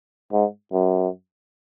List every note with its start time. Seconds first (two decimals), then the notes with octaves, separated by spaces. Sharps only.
0.33 G#2
0.73 F#2